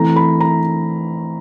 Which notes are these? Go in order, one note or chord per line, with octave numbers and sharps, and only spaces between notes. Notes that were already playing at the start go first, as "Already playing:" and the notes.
Already playing: E3 A3 C4 A#5
B5
A#5